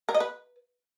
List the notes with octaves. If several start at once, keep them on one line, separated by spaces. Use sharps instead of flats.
A#4
D#5
B4